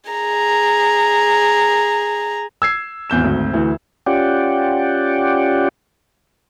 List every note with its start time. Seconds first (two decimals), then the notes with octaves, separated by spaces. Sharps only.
0.10 G#4 A#5
2.62 E6 G#6 C7
3.10 G#1 E2 G6 E7
3.24 G#1 D2
3.53 D2 E3
4.06 C#4 F4 G4 D5 F#5 G5